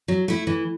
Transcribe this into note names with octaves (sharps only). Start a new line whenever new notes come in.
F#3
A3 E4
E3